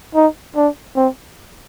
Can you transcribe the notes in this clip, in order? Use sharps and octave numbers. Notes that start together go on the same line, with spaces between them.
D#4
D4
C4